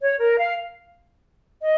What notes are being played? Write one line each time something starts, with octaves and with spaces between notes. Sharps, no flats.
C#5
A#4
F5
D#5